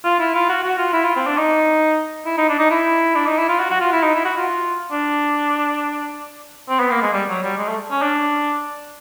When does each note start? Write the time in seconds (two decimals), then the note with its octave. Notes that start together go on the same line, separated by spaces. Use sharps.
0.04 F4
0.20 E4
0.34 F4
0.49 F#4
0.63 F#4
0.78 F4
0.93 E4
1.04 F4
1.16 C4
1.27 D4
1.37 D#4
2.26 E4
2.38 D#4
2.49 D4
2.59 D#4
2.71 E4
3.15 D4
3.27 D#4
3.38 E4
3.49 F4
3.60 F#4
3.70 F#4
3.81 F4
3.92 E4
4.03 D#4
4.15 E4
4.25 F#4
4.37 F4
4.92 D4
6.69 C4
6.80 B3
6.91 A#3
7.02 G#3
7.13 G3
7.29 F#3
7.43 G3
7.58 G#3
7.68 A3
7.91 C#4
8.02 D4